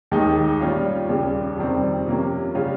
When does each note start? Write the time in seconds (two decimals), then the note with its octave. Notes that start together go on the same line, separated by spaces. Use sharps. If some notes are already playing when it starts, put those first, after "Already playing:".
0.11 D#2 D#3 G#3 D#4
0.60 A#2 G3 C#4 F4
1.09 D#2 C#3 G3
1.57 F2 C3 D#3 G3 C4
2.06 C3 F3 A#3 C#4
2.55 C#3 G3 C#4 F4